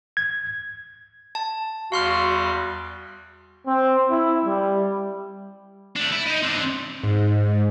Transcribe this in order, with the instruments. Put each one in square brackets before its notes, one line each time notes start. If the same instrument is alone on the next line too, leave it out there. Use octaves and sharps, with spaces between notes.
[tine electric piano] G#6
[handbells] A5
[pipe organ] E2 G3 [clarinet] F#4 [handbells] F5 C6 F6
[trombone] C4
E4
G3
[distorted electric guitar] A3 D4
E4
D#4 D#5
C4 D4
[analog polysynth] G#2